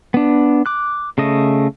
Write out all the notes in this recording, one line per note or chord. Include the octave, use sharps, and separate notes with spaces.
B3 D4
D6 F#6
C#3 A3 D#5